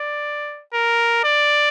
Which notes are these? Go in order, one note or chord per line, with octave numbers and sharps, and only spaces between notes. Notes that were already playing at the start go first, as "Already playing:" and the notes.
Already playing: D5
A#4
D5